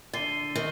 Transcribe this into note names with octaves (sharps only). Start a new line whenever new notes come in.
D3 A6 C7 D#7 G7
D#3